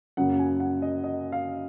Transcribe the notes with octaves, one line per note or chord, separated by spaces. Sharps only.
F#2 C#3 F#3 A#3 F#5
G#5
F#5
D#5
D#5
F5